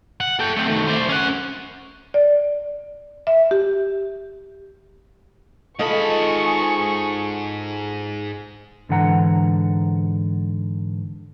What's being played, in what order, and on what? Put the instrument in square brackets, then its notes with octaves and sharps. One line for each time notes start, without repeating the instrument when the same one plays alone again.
[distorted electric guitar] F#5
A4 G5
A3 C4
D#3 A3
C5 D5
C#4 F#5
[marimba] D5
E5
G4
[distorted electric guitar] G#2 B5 [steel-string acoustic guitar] F4 A4 [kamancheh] G#4 C#6 [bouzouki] D#5
[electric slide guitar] G#2 D3 E3 F#5 A#5